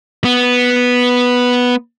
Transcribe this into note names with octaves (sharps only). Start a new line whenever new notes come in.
B3